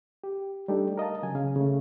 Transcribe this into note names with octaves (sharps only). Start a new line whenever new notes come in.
G4
G3 A3 D4 D#4 G4 A4
A#4 D#5 F5 A5
C#3 F#3 G#5
C#3 F5
C#3 A3